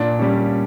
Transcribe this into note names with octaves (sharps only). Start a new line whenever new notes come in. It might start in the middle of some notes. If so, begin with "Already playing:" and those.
Already playing: A#2 D4
G3 C#4